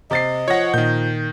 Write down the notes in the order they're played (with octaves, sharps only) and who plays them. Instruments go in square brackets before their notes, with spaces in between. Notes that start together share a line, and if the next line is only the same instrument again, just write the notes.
[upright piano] C3 A6 C7 [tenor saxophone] D#5
[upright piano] F3 A#6 [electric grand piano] C#5 F#5
[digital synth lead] A#2 [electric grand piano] D#3 G6